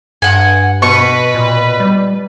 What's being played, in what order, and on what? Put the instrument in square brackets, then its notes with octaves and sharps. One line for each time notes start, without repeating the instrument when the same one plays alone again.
[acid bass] G2 [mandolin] F#5 G#5
[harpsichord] B2 [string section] B4 [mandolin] C#6
[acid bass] A#2
G3